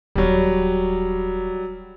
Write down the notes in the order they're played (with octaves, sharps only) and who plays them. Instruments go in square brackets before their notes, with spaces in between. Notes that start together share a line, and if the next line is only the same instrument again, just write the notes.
[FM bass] D#1 [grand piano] F#3 G3